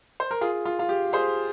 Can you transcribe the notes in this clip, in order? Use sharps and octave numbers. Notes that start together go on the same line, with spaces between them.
C5
A#4
F4 G#4
F4
F4
G4
G#4 C5